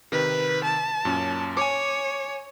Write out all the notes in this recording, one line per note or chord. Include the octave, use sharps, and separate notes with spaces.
C3 D#3 B4
A5
F#2 A#2 C#4
C#5 G#5 D6